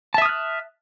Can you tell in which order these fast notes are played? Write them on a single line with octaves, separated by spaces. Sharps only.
A5 E5 D#6 F6 F#6